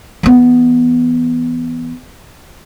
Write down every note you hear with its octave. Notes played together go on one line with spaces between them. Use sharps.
E3 B3